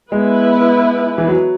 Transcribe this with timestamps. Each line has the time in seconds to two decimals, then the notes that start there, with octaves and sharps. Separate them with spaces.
0.12 G#3 B3 E4 B4
1.18 E3
1.28 F#3